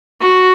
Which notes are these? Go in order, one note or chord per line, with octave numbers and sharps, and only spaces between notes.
F#4